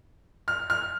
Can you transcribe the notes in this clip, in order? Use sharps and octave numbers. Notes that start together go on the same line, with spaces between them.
F6
F6